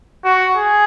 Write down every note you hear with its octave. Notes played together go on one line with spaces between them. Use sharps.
F#4
G#4